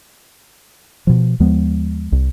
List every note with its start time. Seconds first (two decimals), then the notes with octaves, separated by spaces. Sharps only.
1.07 B2 F3
1.40 D#2 F3 G#3 B3
2.12 C2